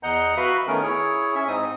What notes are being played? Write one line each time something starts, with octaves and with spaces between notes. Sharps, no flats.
E2 D#5 F#5 A#5 G6
F#4 B4 E5 F5 B5 F#6
D#3 A3 B3 C#4 A#4
E4 G#4 C#5
C#4 E5
G#2 C4 D#4 D#6